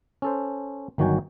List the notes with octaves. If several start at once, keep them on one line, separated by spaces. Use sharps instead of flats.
C#4 A4 C5
G1 D#3 F#3 F#4 G5 G#5